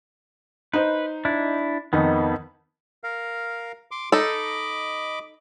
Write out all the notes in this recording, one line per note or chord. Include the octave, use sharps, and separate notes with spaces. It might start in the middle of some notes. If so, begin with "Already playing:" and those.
D#4 B4 C5
D4 E4
F2 D#3 B3 D#4
A#4 F5
C6 D6
D#4 A4 D#5 B5 D6